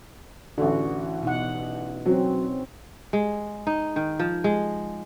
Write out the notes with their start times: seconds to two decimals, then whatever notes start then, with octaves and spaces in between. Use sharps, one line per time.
0.58 A1 D3 E3 F#4
1.23 B2 D#4 F#5
2.06 F#3 C4 C#4
3.13 G#3
3.67 D#4
3.96 D#3
4.19 F3
4.44 G#3